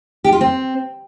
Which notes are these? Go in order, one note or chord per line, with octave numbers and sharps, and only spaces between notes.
G4
F4
C4